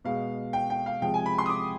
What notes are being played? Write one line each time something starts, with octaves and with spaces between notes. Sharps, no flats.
B2 G#3 F5
G5
G5
F5
C3 F3 G#3 G5
G#5
B5
C6
D#6
D6